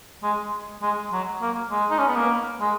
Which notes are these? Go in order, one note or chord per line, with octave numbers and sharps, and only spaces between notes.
G#3
G#3
F#3
A#3
G#3
D#4
C#4
B3
A#3
G#3